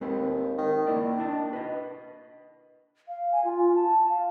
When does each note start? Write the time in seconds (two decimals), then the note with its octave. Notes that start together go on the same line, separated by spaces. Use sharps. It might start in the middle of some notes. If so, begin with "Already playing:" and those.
0.01 D#2 G#3 C4 B4
0.58 D#3
0.87 D#3 A#3 E4 D5
1.18 D4 D#5 A5
1.53 B4 D#5
3.08 F5
3.32 G#5
3.45 F4
3.75 A5
4.09 F5